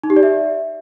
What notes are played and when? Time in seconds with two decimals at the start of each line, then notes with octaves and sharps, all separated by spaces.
0.04 D#4
0.10 G4
0.16 D5
0.23 E5